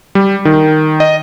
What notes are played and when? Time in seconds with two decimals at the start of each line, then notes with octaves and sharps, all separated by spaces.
0.15 G3
0.45 D#3
1.00 D#5